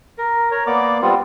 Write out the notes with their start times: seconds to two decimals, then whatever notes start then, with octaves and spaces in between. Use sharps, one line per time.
0.18 A#4
0.51 A#4 C#5
0.67 A#3 B3 D5 D6
1.02 G3 B3 C4 F4